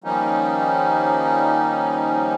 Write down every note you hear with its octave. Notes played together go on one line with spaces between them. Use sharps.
D#3 F3 G3 A#3 C#4 D#4